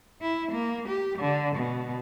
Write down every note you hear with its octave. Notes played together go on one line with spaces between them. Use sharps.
E4
A#3
G4
D3
B2